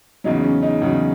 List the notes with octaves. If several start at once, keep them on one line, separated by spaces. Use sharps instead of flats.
E2 C#3 F#3 D#4
C#4
D#4
E2 C#3 F#3